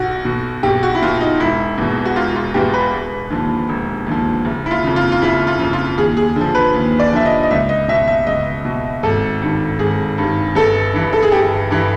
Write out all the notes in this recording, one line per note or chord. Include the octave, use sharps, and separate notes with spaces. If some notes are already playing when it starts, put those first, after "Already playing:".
Already playing: B1 F#4
B2
B1 G4
F#4
E4
B2 F4
D#4
E1 E4
E2 B2
F#4
E1 F4
F4
E2 B2 G4
B4
E1
D#2 D3 F3
E1
D#2 D3 F3
F#1
E4
F4
F2 C#3
F4
F4
F#1 E4
F4
F2 C#3
F4
D#2 G#4
G#4
D3
F3
B4
D#2
D5
D3 F3 E5
D#5
D#5
C#2 E5
D#5
B2 E5
E5
C#2 D#5
B2
G#1 A4
G2 D#3
G#1 G#4
G2 D#3
G1 A4
G2 E3
A4
G#4
G1 G4
G2 E3